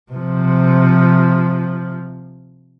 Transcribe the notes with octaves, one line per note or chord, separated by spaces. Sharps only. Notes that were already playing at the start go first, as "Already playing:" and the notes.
C3 F3